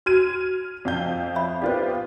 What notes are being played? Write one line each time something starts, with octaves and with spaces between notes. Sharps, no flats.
F#4 F6 G#6 D#7
F2 F5 G6
C#5 E5 B5
B3 F4 G4 C5 D5